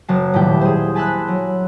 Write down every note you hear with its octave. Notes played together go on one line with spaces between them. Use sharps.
F#1 F#3 A5 C7
D#1 A2 G3 E4 G4 G5
G#4 C5
G#5 A5 B5 C6 E6 F#6
F#3